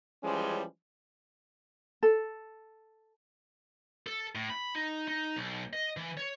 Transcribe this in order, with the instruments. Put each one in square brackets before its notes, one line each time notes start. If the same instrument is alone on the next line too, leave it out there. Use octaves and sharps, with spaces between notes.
[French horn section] E3 F3 G3 G#3 C#4
[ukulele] A4
[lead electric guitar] A4
A2
B5
D#4
D#4
B1
D#5
E3
C#5